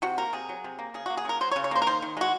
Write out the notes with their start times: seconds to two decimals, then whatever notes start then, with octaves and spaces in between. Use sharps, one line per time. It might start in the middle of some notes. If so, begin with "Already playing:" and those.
0.02 C3 F#4
0.18 A#3 A#4
0.33 C3 G#4
0.49 F#3
0.64 C3
0.79 A#3
0.94 C#3 G#4
1.06 A#3 F#4
1.17 G#4
1.25 C#3 A#4
1.40 F#3 C5
1.51 C#5
1.56 C#3
1.64 C#5
1.71 A#3 C5
1.82 A#4
1.87 D#3 C5
2.02 D#3
2.17 G#3 F#4